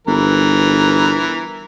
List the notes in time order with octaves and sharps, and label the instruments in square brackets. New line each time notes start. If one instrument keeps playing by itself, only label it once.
[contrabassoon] G1 [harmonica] E3 A#4